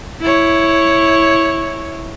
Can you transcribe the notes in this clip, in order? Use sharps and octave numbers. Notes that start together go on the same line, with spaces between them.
E4 C#5